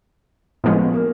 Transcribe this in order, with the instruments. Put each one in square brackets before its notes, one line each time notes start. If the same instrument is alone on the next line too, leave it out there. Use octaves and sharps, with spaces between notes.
[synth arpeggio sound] A2 F3 G#3 C#4 [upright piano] B3
[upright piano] A#3